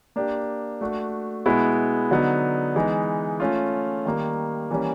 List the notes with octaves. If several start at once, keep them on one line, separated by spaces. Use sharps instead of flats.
A#3 D4 G4
A3 D4 F#4
B2 G#3 B3 E4
D3 F#3 B3 D#4
E3 G#3 B3 D#4
A3 C#4 F4
D#3 G3 A#3
E3 G3 A#3 C#4